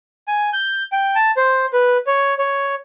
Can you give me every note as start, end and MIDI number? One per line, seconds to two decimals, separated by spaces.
0.28 0.50 80
0.53 0.83 91
0.92 1.15 79
1.15 1.31 81
1.37 1.66 72
1.73 1.98 71
2.07 2.34 73
2.39 2.75 73